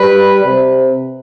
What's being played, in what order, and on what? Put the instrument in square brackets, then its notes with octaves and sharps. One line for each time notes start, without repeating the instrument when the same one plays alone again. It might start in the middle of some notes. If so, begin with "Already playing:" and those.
Already playing: [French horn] G3 [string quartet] B4
[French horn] C3